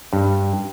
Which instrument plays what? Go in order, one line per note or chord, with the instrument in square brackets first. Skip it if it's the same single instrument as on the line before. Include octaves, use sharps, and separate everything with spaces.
[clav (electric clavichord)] G2